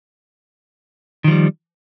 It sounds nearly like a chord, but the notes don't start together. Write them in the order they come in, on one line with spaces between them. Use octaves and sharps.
D#3 F3 G3